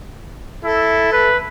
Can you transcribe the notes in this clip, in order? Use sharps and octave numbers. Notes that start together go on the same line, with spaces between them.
E4 A4
B4